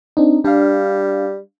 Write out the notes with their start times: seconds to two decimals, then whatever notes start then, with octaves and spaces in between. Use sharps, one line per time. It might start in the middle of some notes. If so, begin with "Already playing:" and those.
0.17 C4 D4 D#4
0.44 G3 D4 F5